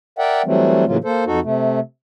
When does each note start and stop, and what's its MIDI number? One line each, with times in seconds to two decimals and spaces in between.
0.19 0.42 70
0.19 0.42 74
0.19 0.42 76
0.19 0.42 78
0.19 0.42 79
0.45 0.85 52
0.45 0.85 54
0.45 0.85 55
0.45 0.85 57
0.45 0.85 60
0.87 0.97 45
0.87 0.97 49
0.87 0.97 52
0.87 0.97 54
0.87 0.97 58
0.87 0.97 65
1.04 1.24 58
1.04 1.24 69
1.04 1.24 72
1.26 1.40 41
1.26 1.40 63
1.26 1.40 66
1.26 1.40 69
1.43 1.80 48
1.43 1.80 57